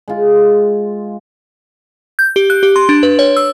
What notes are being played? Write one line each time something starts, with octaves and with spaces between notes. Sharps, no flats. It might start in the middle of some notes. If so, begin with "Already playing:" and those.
G#3 F4
G6
G4
F#6
G4
C6
D4
B4
C#5
E6